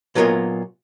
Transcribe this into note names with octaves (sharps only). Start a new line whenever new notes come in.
A#2 F#3 B3 F4 A#4 D#5